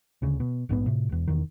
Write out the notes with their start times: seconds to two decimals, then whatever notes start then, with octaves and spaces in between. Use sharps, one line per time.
0.22 D2 C#3
0.40 B2
0.69 A#1 G#2 C3 B3
0.86 A2 C3
1.09 E1 E2
1.28 E1 E2 D#3